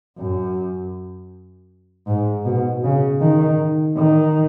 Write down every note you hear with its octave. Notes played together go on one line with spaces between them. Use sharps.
F#2
G#2
B2
C#3
D#3
D#3